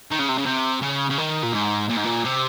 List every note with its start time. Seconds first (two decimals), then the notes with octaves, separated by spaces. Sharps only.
0.11 D#3
0.19 C#3
0.28 C3
0.38 C#3
0.46 C3
0.82 C#3
1.10 C#3
1.18 D#3
1.43 A#2
1.52 G#2
1.88 A#2
1.96 G#2
2.04 A#2
2.24 C3